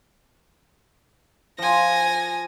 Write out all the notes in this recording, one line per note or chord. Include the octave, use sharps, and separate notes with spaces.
F3 G#5 A#6